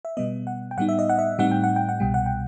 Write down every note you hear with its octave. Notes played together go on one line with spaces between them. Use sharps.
E5
B2 G3 B3 D#5
F#5
G5
A2 G3 B3 D#4 F#5
E5
D#5
F#5
E5
A2 G3 C4 D#4 F#5
G5
F#5
G5
F#5
C2 B2 G3 G5
F#5
G5